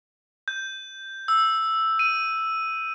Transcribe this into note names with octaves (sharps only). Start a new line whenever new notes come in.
G6
E6
D#7